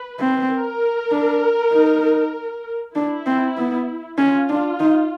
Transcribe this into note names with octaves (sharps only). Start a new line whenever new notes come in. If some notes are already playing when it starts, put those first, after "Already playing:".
Already playing: B4
C4
A#4
D4
D#4
D4 E4
C4
B3
C#4 F4
D4
D#4